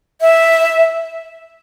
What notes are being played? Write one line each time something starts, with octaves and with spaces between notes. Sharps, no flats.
E5